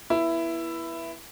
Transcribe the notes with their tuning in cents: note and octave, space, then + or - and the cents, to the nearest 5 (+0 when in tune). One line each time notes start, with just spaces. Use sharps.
B3 -30 E4 +10